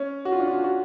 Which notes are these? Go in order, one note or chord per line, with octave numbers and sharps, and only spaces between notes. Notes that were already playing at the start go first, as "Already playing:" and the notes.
Already playing: C#4
F#4
F4
D4
F4
F#4